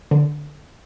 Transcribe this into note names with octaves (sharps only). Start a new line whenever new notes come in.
D3